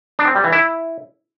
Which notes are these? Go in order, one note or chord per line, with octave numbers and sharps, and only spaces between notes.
D4
C4
G3
E3
E4